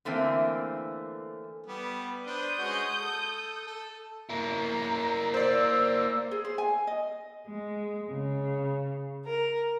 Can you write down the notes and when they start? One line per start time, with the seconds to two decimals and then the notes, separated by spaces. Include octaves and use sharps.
0.05 D3 E3 A3 A#3 C4
1.66 G3 B3
2.26 D4 B4 C5 D#6 G6
2.58 G#3 C#4 F#4
3.00 A4
3.67 A4
4.29 A#3 E4 A#5
5.34 C5 D5 E6
6.31 G#4
6.45 C5
6.58 G#5
6.87 D#5
7.46 G#3
8.11 C#3
9.24 A#4